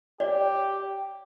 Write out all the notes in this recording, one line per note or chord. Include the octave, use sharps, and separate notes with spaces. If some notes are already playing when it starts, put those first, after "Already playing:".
G4 C#5 D5